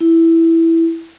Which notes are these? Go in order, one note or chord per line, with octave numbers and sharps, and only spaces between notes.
E4